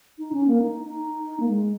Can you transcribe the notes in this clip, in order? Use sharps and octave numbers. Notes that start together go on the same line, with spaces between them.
D#4
C#4
A#3
D#4
D#4
A#3
G#3